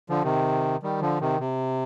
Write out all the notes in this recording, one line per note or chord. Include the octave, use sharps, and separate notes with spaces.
D3 F3
C3 D#3
D#3 G3
D3 F3
C3 D#3
C3